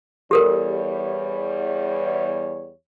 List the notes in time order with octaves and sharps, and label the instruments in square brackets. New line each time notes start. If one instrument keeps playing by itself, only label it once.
[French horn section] E2 G3 C#5 [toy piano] G4 A4 A#4